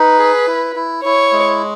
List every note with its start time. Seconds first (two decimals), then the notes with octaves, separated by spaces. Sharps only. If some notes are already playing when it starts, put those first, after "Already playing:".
Already playing: D#4 B4
0.19 G#4
0.47 E4
0.76 E4
1.04 E4 C#5
1.32 G#3